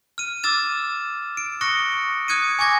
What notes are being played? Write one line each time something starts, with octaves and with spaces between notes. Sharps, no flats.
F6 D#7
D6 E6 F6 A6 E7
D7
C#6 D#6 F#6 A#6 C#7
D#6 F#6 G#6 C#7 D#7
G#5 C#6 D6 G#6 A#6